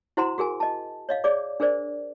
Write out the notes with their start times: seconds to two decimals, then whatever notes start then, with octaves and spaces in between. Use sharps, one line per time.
0.17 E4 F#4 C5 F#5 A#5 C6
0.38 F#4 G#4 A#4 G#5
0.60 D#5 A5
1.09 C#5 D#5 F5
1.24 G#4 C#5 D5 D6
1.60 D4 G#4 A#4 C5 D5